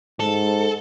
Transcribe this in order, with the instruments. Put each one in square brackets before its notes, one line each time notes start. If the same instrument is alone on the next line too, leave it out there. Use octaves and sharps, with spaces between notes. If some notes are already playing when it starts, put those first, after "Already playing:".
[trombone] G#2 [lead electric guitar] A4